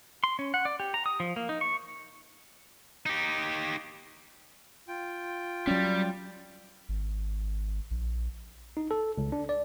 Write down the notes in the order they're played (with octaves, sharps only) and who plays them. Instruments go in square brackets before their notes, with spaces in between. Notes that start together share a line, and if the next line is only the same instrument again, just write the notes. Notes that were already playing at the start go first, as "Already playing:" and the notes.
[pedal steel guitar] C6
C#4
F#5
D5
G4
A#5
D#6
F3
A#3
D#4
C#6
[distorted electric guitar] D#4 G4
[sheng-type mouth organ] F4 G5
[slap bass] F#3 C#4 [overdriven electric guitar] G3
[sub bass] G#1
A#1
[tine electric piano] D#4
A4
C#2
D4
D5